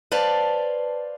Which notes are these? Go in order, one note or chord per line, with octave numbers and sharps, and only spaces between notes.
B4 C5 D5 F5 A5